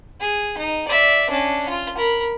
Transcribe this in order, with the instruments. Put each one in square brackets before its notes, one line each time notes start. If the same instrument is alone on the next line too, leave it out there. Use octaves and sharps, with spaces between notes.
[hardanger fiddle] G#4
D#4
D5 E5
C#4 D4
F4
A#4 B5